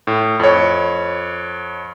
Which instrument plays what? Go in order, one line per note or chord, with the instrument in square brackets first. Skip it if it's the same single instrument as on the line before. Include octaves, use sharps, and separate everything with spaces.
[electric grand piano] A2
F2 C#5